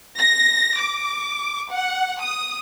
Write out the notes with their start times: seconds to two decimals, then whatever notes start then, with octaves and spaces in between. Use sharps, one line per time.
0.18 A#6
0.79 D6
1.71 F#5
2.20 D#6